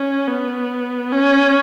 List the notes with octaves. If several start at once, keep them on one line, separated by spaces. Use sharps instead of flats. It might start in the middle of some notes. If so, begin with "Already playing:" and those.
Already playing: C#4
B3
C#4